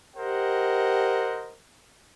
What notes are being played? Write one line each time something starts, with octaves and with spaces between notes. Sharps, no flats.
G4 A#4 C5 D#5 F#5